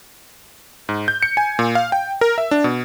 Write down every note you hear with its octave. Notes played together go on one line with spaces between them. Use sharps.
G#2
G6
C#7
G#5
A#2
F5
G5
A#4
E5
D4
B2